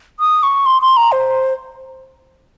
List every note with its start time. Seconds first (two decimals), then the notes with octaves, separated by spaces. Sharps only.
0.20 D#6
0.43 C#6
0.66 C6
0.82 C6
0.97 A#5
1.12 C5